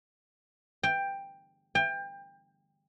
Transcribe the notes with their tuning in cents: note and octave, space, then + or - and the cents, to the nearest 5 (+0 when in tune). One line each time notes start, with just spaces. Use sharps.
G5 +10
G5 +25